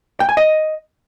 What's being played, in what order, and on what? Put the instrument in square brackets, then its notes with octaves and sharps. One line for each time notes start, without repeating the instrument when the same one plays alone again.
[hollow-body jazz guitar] G5
G#5
D#5